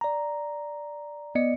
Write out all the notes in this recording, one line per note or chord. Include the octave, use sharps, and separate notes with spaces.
D5 A#5
B3 D5 D#5 C#7